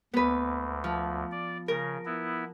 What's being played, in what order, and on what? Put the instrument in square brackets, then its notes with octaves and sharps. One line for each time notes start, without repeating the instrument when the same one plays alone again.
[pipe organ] D2 [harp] B3 B4
[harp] F3
[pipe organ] D5
[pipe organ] C#3 [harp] A#4
[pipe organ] B3 E4